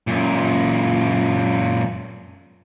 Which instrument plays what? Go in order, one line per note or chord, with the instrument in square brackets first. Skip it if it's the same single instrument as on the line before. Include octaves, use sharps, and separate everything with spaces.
[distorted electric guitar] F#2 A#2